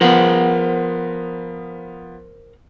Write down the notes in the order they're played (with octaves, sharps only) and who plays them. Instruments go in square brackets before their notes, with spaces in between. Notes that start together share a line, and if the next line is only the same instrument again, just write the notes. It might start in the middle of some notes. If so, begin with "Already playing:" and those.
[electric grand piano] F3 B3 [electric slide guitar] A#4 C5 F#5